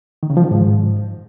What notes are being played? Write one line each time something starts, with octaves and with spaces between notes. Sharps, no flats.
D#3
C#3
F3
D#3
G#2